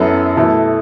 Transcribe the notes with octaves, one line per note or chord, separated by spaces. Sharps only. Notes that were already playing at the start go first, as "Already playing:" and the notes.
Already playing: F#2 F#3 B3 E4 A4
B2 A3 E4 A4